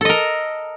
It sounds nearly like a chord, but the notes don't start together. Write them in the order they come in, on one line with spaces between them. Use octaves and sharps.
A4 D#5 A#4